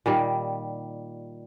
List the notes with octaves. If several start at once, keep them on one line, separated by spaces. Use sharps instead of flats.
A#2 D#3 G3